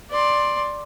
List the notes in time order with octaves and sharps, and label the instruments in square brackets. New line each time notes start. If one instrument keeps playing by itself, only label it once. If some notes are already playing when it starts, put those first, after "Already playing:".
[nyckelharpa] D5 C6